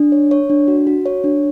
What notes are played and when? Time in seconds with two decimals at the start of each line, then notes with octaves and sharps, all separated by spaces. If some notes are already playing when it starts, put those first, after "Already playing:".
Already playing: D4
0.12 C#5
0.31 C#5
0.50 D4
0.68 F#4
0.87 F#4
1.06 C#5
1.24 D4